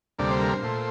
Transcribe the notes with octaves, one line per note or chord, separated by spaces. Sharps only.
D2 C3 G3 A#3 D5
C5
A#4
C5
A#2 A3